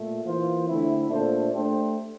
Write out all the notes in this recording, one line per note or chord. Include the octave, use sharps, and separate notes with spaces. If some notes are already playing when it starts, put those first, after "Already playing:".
Already playing: A#2 A3
E3 A#3 F4 C5
D3 A3 C4 E4
A#2 A3 D4 A4 C5
A3 D4 G4 C5